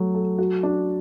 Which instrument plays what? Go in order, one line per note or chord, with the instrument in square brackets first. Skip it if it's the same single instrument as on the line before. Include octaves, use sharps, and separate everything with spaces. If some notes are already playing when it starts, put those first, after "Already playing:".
Already playing: [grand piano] F#3 A3
A4
F#4
D4